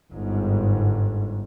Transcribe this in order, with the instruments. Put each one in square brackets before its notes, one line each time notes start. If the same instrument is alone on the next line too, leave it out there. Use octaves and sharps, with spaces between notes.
[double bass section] G1 G#2